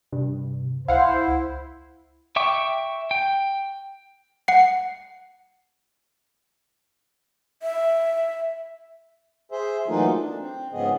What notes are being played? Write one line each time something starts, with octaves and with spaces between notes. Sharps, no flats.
G2 C3
C#2 E4 C5 F5 F#5
E5 G5 C#6 D6
G5
F#5 C7
E5
G#4 C5 E5
E3 F#3 A3 A#3 D#4 F4
D4
C4
G#2 C#3 F3 B3 G#4 D#5